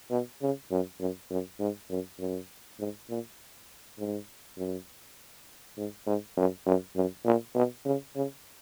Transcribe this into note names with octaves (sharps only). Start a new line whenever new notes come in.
B2
C#3
F#2
F#2
F#2
G#2
F#2
F#2
G#2
A#2
G#2
F#2
G#2
G#2
F#2
F#2
F#2
A#2
B2
C#3
C#3